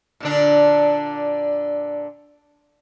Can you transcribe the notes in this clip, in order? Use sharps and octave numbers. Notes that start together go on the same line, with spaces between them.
A#2 D3 D4